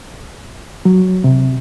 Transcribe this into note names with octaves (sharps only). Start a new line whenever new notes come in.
F#3
C3